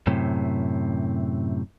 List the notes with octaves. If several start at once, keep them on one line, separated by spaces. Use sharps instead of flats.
F#2 A2 C3